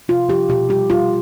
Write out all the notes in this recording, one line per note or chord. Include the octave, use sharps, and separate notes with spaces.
C3 F4
F3 G4
B2 G4
G3 G4
G3 F4